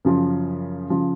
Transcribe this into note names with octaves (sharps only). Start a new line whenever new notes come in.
F#2 C#3 F3
C#3 F3